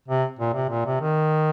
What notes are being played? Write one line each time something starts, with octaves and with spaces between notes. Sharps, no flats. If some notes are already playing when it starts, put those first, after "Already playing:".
C3
A#2
C3
A#2
C3
D#3